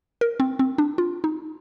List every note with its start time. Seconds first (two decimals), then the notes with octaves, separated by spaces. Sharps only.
0.21 A#4
0.40 C4
0.59 C4
0.78 D4
0.98 F4
1.24 D#4